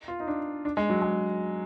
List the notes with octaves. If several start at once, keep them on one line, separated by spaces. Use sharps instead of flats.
F4
D#4
D4
D4
G#3
F#3
G#3